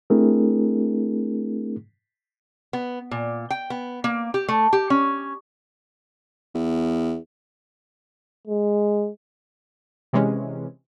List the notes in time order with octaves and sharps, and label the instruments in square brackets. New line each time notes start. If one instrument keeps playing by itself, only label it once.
[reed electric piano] A3 C4 D4 E4 G#4 A#4
[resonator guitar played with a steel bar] B3
A#2
G5
B3
A#3
G4
A3
G4
C#4
[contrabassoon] E2
[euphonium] G#3
[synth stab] C3 E3 G#3 C#4